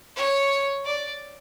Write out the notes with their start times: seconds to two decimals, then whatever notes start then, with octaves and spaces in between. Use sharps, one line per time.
0.16 C#5
0.85 D5